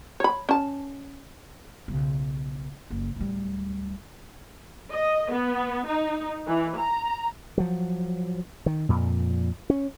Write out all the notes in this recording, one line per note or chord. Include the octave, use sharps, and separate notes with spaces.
C#5 B5
C#4 A5
B1 C#3
F#1
D1 G3
D#5
B3
D#4
E3
A#5
F3 F#3
D#3
F2 A#2
C#4